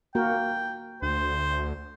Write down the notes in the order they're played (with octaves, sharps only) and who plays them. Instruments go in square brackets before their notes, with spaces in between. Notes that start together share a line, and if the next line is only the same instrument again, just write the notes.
[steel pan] A#3 F#4 A#4 [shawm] G5
[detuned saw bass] D2 [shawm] C5